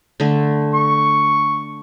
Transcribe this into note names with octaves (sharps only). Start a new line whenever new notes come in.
D3 A3
C#6